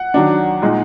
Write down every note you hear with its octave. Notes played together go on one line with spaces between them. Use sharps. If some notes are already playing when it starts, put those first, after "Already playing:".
Already playing: F#5
D#3 F#3 D4
A#2 G#3 D#4